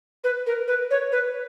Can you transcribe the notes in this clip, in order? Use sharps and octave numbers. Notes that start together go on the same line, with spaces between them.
B4
A#4
B4
C#5
B4